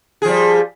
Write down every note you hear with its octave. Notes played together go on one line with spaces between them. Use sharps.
F3 G3 G#4